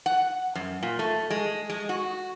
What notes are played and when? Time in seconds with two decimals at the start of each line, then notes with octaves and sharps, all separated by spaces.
0.06 F#5
0.55 F#2
0.83 A#2
0.99 A3
1.30 G#3
1.70 G#3
1.89 F#4